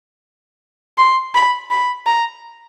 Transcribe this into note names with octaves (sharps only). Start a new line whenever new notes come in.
C6
B5
B5
A#5